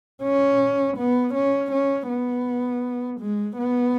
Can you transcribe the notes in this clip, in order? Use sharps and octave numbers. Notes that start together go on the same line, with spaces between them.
C#4
B3
C#4
C#4
B3
G#3
B3